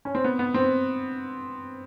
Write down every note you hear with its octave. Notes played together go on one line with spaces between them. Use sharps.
C#4
C4
B3
B3
C4